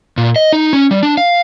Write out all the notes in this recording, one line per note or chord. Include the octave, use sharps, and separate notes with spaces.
A#2
D#5
D#4
C#4
G3
D4
F5